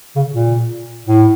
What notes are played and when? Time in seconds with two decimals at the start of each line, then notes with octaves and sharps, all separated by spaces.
0.16 C#3
0.31 A#2
1.07 A2